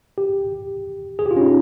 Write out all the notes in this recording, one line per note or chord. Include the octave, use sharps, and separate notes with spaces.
G4
G#4
G4
F4
C#4
D#4